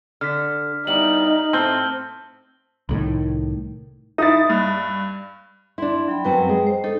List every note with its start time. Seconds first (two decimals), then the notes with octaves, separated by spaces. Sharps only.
0.21 D3 F6 B6
0.87 G3 B3 D#4 E4 F#7
1.53 A2 A3 C4 A5 F6 G7
2.89 C2 A2 D#3
4.18 D#4 E4 D#6 A6
4.50 G2
5.78 D4 E4 C6
6.08 F#3 G5 B5
6.25 F#2 F#3 C4 B4 G5
6.49 G#3
6.67 C5
6.84 D#4 A4